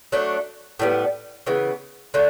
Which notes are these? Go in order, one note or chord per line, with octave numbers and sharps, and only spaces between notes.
F#3 A3 D4
A2 G3 B3
C#3 E3 B3
D3 A3 D4